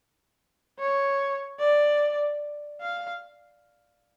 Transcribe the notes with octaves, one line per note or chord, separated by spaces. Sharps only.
C#5
D5
F5